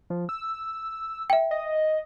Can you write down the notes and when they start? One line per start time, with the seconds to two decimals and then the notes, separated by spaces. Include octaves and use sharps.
0.10 F3
0.29 E6
1.30 E5 G5
1.51 D#5